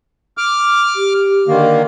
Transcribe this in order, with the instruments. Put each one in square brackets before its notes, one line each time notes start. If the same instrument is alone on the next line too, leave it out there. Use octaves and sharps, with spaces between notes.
[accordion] D6 F6
[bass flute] G4
[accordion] D3 D#3 A#3